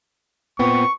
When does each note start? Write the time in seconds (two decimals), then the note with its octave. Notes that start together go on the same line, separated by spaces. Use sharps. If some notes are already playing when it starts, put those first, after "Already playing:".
0.59 A#2 B3 C4 C#6